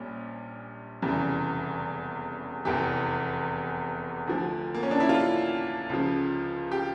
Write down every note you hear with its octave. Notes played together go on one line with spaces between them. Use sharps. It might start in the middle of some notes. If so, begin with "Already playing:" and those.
Already playing: A#1 A#2 G3 C#4
F1 E2 C#3 E3 G3
F1 E2 E3 G4
D2 D3 F3
A#3
C#4
D4
E4
F4
C#2 C#3 F3
G4